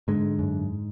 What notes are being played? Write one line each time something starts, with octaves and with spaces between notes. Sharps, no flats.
G#2 D3 G#3
F#2